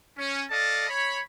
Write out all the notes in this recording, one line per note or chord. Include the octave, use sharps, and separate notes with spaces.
C#4
A4 D5 D#5 F5 A5
C#5 B5